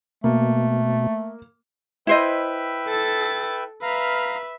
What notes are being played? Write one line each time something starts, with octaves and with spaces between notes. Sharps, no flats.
B2 A3 A#3
E4 B4 C5 D#5 E5 G5
A4 A6
B4 E5 F5 A#5 F6